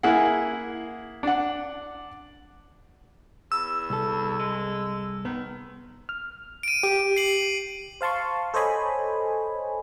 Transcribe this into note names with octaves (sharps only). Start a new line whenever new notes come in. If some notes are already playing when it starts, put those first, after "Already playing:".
A#3 E4 G#4 F#5
D4 F#5
E2 E6
C2 A4
G#3
D#3 B3
F6
D7 D#7
G4
C7 F#7
C5 F5 A5 C6 C#6
A4 C5 C#5 D#5 G#5 B5